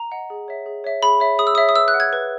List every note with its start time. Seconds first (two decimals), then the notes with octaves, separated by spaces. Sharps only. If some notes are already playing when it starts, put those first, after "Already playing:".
Already playing: A#5
0.11 D#5 F#5
0.30 G#4
0.48 C#5 E5
0.66 G#4
0.84 C#5 E5
1.02 G#4 B5
1.20 C#5 E5
1.39 G#4 D#6
1.47 E6
1.55 C#5 E5 D#6
1.69 D#6
1.75 B4 E6
1.88 F#6
1.94 F#5
2.00 G#6
2.13 B4